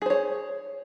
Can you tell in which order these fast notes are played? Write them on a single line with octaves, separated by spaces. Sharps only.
G#4 C5 C#5